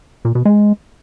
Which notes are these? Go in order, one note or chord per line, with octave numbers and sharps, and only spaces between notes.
A#2
B2
G#3